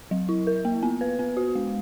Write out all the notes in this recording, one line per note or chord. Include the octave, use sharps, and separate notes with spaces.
F#3
E4
A#4
A#3
B3
B4
B3
F#4
G#3